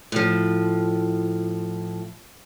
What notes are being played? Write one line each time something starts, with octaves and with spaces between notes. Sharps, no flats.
A2 F3